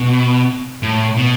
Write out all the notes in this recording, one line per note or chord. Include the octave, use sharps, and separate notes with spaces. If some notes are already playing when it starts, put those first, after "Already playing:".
Already playing: B2
A2
B2